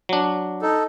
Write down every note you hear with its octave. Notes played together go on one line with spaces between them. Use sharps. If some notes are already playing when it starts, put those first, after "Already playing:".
F#3 D4
D#4 A4